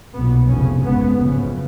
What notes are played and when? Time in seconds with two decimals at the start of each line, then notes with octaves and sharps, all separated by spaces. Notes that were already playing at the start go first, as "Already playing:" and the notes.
0.15 B1 A#2 B3
0.49 F1 F2 C#3 C#4
0.83 G#1 G#2 B3
1.18 F#1 F2 C#3